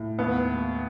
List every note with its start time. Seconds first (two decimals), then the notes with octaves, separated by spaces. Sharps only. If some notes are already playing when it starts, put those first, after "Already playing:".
Already playing: A2
0.19 D#2 B3